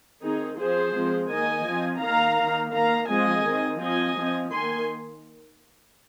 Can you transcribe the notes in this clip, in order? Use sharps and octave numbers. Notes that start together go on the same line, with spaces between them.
D#3 C4 D#4 G#4
F3 C4 G#4 C5
F3 G#3 C4
D#3 A#3 D#5 G#5
F3 C4
D#3 A#3 F5 A#5
D#3 A#3
D#3 A#3 F5 A#5
F3 G#3 C4 D#5 G#5
D#3 C4
F3 C4 D#5 G#5
F3 C4
D#3 A#3 G#5 C6